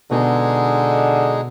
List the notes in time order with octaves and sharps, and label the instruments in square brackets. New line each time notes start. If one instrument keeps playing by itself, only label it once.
[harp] B2 [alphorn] D3 [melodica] G#3 D#4 G#4